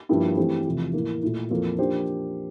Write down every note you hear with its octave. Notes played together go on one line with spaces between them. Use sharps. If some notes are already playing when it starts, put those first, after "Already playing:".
G2 F3 A#3 E4 G4
E3 A3 C4 G4 C5
E2 C3 F3 A3
A2 E3 A#3
A#2 A3 E4
F2 E3 A#3 F4 A4
F3 A#3 D4 G4 C5